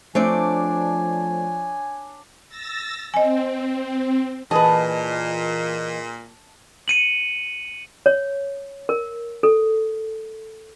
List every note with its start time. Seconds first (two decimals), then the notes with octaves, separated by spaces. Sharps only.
0.15 F3 A3 C4 D4 C#5 D5 G#5
2.49 E6 A6 A#6
3.14 C4 D#5 G#5
4.51 A#2 E3 G#4 B4 D#5 A5
6.88 C#7 D#7 F#7
8.06 C#5
8.89 A#4
9.43 A4